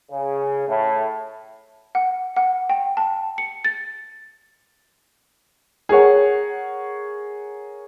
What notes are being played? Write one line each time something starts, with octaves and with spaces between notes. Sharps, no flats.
C#3
A2
F#5
F#5
G5
A5
C#7
A6
G#4 A#4 C#5 F#5